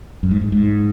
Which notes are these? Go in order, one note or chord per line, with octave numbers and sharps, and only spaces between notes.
F#2
G#2
G#2
G#2